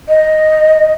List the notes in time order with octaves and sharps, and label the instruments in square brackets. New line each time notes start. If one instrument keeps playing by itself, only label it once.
[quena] D#5